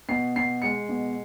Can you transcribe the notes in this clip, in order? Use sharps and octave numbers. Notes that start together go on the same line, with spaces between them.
B2 C7
B2 C7
G#3 C#7
B2